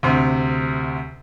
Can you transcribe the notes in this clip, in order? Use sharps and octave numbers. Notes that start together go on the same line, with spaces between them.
D2 C3